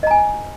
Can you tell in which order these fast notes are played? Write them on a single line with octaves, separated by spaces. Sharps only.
D#5 A#5 G#5